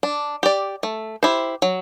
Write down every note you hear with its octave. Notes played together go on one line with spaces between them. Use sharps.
D4
G4 D5
A3
E4 G4 C5
F#3